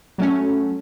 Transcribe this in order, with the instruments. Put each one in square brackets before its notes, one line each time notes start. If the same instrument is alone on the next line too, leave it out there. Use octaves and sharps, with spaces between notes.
[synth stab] F#3 A3 C#4